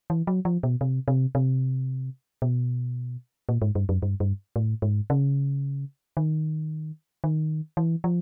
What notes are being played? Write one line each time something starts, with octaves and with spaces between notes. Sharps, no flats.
E3
F#3
F3
B2
C3
C3
C3
B2
A#2
G#2
G2
F#2
G2
G2
A2
G#2
C#3
D#3
D#3
E3
F3